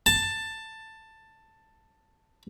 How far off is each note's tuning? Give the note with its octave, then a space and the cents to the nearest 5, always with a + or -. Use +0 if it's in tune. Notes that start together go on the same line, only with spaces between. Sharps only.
A5 +10